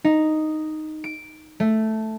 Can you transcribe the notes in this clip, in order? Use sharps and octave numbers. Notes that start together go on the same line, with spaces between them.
D#4
D7
A3